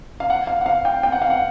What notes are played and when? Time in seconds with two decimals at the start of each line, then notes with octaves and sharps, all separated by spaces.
0.20 F5
0.30 F#5
0.47 F5
0.61 F#5
0.66 F5
0.85 G5
1.03 G5
1.12 F#5
1.22 F5
1.30 F#5